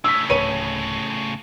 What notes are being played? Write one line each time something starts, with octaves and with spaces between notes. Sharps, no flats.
A2 C#3 E6 B6
D1 B4 C#5 B5 D#7